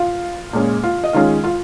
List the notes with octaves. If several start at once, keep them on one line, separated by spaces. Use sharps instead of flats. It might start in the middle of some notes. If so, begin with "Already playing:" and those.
Already playing: F4 F5
A#2 G#3 C#4
F4 F5
D#5
D#3 G#3 C#4 F4 F5
F4 F5